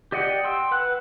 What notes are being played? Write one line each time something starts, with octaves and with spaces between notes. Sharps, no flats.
G4 D5 D#5 F#5 G5
G5 C6 E6
B4 F#5 E6 F#6